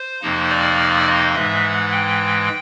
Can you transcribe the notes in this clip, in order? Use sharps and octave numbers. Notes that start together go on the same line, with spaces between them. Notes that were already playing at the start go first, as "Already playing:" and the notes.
Already playing: C5
F2 C3 F3 A#3 D#4
D5
D#5
G#2 E3 G#3 E5
F#5
G5